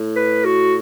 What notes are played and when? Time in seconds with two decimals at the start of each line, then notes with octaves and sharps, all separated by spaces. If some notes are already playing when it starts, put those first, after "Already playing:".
Already playing: A2
0.16 B4
0.45 F#4